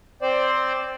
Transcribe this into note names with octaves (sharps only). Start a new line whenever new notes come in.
C4 C5 D5